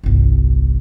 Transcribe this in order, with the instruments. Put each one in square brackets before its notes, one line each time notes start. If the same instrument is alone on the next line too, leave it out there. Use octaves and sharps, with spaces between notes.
[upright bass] G1 C2